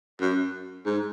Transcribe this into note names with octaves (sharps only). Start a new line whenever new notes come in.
F#2
G#2